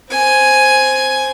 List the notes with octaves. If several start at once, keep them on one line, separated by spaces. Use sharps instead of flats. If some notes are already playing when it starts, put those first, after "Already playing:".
C4 G#5